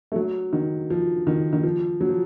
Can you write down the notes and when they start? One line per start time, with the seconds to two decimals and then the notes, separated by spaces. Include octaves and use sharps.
0.12 A3
0.16 F#3
0.53 D#3
0.90 F3
1.27 D#3
1.53 D#3
1.63 F3
2.01 F#3
2.09 F3